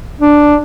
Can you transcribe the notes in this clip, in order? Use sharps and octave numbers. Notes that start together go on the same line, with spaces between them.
D4